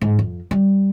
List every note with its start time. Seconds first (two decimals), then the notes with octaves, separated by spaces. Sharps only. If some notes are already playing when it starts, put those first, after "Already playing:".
0.01 G#2
0.19 F2
0.51 G3